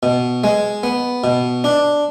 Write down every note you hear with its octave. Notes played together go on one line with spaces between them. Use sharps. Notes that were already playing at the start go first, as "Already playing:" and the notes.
B2
G#3
B3
B2
D4